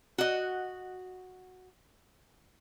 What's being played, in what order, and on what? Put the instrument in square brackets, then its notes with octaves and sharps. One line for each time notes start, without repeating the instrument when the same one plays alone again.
[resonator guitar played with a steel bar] F#4 D#5